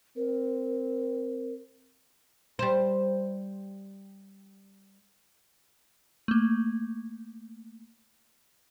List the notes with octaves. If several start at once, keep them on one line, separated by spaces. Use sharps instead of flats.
C4 A#4
G3 C5
A3 A#3